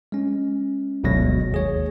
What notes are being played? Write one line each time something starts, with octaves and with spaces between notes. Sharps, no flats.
G#3 C#4
G1 D2 B2 F#3 G#3 A#6
D#2 G#4 C#5